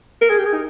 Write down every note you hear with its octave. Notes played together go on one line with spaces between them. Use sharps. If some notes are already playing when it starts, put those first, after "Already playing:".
A#4
G#4
G4
G#4
D#4